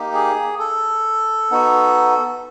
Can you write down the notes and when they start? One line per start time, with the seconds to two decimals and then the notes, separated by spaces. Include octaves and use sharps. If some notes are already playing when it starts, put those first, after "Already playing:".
Already playing: A#3 D#4 G4
0.14 G#4
0.59 A4
1.51 B3 D#4 F#4